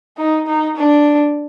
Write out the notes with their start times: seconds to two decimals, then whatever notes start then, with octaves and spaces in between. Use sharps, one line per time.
0.17 D#4
0.47 D#4
0.76 D4